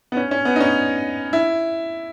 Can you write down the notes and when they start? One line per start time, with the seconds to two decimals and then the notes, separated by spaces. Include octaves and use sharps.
0.12 B3
0.17 C#4
0.31 C#4
0.45 B3
0.56 D#4
0.60 C#4
1.33 E4